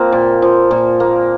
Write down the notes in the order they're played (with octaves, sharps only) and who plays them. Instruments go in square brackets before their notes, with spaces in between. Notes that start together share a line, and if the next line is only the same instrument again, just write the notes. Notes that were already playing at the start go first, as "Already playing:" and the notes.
Already playing: [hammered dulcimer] F3 A#3 C4
A#2
F3
A#2
A#3